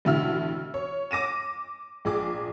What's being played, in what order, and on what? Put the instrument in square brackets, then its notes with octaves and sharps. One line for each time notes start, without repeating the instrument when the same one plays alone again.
[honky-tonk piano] A1 B2 D3 E4 E6 F6
C#5
D6 A#6 D#7 E7
A#1 G#4 D6